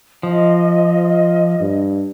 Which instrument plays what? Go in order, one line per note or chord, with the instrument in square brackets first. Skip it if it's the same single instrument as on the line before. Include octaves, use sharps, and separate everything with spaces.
[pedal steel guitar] F3 [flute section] D#5
[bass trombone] G2